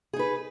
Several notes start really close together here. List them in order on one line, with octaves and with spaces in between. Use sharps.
G#4 D#4 B4